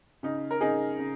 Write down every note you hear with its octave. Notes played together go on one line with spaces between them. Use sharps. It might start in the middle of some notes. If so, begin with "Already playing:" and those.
C#3 D#4
A#4
C#3 D#4 G#4
C#3